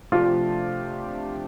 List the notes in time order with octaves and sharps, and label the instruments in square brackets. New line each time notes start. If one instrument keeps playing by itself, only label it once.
[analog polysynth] C3 F3 A3 D4 G4 [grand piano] F4